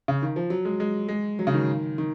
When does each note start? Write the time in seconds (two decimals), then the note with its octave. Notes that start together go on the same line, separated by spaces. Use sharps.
0.08 C#3
0.22 D#3
0.36 F3
0.50 F#3
0.65 G#3
0.80 G#3
1.09 G#3
1.39 F#3
1.47 C#3
1.54 D#3
1.98 D#3